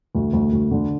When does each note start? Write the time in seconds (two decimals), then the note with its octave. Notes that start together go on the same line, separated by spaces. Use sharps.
0.15 D2
0.33 D2
0.52 D2
0.71 D3